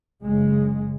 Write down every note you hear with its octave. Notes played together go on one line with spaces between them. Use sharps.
F#1 C#3 G#3